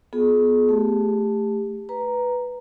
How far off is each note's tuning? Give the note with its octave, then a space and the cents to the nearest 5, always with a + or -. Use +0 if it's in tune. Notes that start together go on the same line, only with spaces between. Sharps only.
B3 +0 F4 +35 G#4 +35
A3 +0 G4 +30
B4 +0 A#5 +0